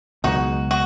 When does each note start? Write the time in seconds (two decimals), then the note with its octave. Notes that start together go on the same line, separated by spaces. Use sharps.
0.24 C#2 B2 F#3 D#4 F#4
0.71 F#4